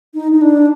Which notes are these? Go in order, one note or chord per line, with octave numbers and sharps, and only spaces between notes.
D#4
D#4
D4